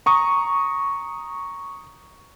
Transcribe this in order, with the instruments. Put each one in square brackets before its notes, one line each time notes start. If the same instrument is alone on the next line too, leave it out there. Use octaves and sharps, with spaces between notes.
[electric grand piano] A#5 C#6 D#6